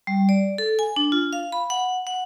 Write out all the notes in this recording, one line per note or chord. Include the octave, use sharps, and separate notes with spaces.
G3
D5
A4
G#5
D4
F4
F5
B5
F#5
F#5